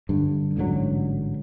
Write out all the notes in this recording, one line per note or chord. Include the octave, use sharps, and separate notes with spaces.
G2 D3
A1 G#2 D3 F#3